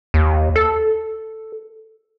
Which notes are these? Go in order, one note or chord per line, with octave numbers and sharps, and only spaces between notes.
D#2
A4